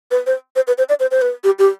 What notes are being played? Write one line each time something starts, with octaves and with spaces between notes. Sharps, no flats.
B4
C5
C5
B4
C5
D5
C5
C5
B4
G4
G4